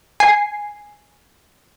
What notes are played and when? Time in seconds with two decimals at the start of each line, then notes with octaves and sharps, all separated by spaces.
0.20 G#5 C7